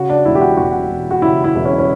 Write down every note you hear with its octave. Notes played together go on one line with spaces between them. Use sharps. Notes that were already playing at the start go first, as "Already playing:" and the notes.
Already playing: C#3 F#4
D4
E1 E4
G4
F#4
E1 F#4
E1
F#4
C#3 E4
E4
E1
C#4
C#4